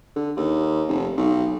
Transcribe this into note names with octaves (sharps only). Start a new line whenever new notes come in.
D3
D#2
F1
B1